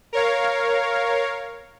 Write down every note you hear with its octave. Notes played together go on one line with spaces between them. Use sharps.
A#4 C#5 F5